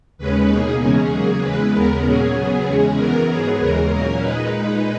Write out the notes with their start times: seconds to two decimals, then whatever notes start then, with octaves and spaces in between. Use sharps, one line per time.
0.18 D#2 C#3 G#3 C#4 B4
0.49 B2 A#3 D#4 G#4
0.79 E2 C#3 G#3 C#4 G#4
1.11 C#3 F#3 A#3 G#4
1.42 E2 C#3 E3 G#3 B4
1.73 D#2 C#3 G#3 B3 A#4
2.04 A#2 F#3 C#4 G#4
2.35 C#3 F#3 B3
2.66 E2 C#3 G#3 C#4
2.97 F#2 E3 B3 A#4
3.28 G#2 F#3 B3 G#4
3.59 D#2 C#3 E3 G#3 A#4
3.90 A#2 F#3 A#3 C#4
4.21 A#2 G#3 D#4 B4